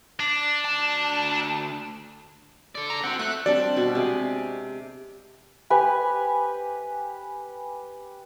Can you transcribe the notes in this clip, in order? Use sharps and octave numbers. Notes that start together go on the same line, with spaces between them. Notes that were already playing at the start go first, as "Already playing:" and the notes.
D4
D2 A5
A4 D5
A#5
C4 F#4 F#5
A3 F#6
G3 C4 D4 D5
B2 B5
C3 G#3
G4 B4 G#5